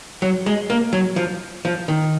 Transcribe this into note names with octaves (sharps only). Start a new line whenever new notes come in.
F#3
G#3
A#3
F#3
F3
F3
D#3